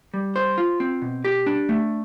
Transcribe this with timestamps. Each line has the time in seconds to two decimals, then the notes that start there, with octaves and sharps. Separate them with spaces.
0.14 G3
0.36 C5
0.58 F4
0.80 C4
1.02 B2
1.25 G4
1.46 D4
1.69 A3